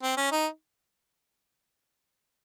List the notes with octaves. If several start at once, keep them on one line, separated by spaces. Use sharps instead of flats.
C4
C#4
D#4